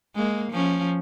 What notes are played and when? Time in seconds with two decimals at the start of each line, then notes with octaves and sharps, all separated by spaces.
0.15 G#3 A#3
0.51 F3 C#4